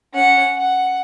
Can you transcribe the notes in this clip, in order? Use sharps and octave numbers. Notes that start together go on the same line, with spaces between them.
C#4 F#5
F#5